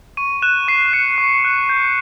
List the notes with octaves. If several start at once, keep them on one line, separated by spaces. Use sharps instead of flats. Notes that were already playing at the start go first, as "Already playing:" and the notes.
C#6 D#7
F#6 E7
C#6 C7
F#6 C#7
C#6
F#6
G6